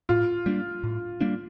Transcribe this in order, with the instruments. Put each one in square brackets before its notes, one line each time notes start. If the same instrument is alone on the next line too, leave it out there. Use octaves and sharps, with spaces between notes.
[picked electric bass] A2 [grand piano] F4
[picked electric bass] G3 A#3 D4
A2
G3 A#3 D4